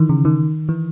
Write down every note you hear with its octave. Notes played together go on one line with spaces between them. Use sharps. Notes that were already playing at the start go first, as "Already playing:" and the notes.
Already playing: D#3 E3
C#3
D#3
E3